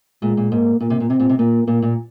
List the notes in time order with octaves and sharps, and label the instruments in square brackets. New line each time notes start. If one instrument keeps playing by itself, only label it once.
[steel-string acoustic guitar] A#2 [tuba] G#3
[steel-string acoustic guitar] A#2
[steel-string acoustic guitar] G#2 [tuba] A#3
[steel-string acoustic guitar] A#2 [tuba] A#3
[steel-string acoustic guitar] C3
A#2
[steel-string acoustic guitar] C3 [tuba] C4
[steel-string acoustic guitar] A#2
C3
[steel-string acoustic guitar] A#2 [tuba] A#3
[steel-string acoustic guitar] A#2 [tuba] A#3
[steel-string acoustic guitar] A#2